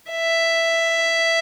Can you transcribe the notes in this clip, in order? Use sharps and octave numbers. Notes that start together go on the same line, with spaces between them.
E5